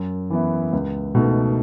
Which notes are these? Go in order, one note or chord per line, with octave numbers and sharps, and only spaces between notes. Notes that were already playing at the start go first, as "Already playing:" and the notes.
Already playing: F#2
E3 B3 E4
C#2
B2 A3 D#4